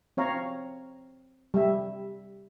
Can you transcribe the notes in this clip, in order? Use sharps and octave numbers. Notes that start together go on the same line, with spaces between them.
C4 C#5 F5 A#5
G3 E5